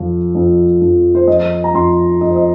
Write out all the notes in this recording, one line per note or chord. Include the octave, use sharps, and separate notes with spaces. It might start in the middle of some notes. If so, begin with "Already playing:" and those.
Already playing: F2 F3
F2
F2
C5
F3 D#5
A#5
F2 C6
F2 D#5
C5
D#5